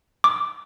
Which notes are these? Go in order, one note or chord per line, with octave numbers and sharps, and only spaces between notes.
D6